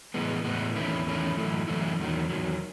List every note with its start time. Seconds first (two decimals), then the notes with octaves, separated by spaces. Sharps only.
0.14 A2 E3 G#3 B3
0.44 A2 E3 G#3 B3
0.75 E2 D#3 A3 C#4 E4
1.07 E2 D#3 A3 C#4 E4
1.37 F#2 E3 A3 E4
1.68 F#2 E3 A3 E4
2.00 E2 D#3 F#3
2.30 E2 D#3 F#3